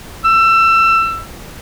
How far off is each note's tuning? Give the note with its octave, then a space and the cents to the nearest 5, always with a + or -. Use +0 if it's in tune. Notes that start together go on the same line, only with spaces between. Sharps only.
E6 +25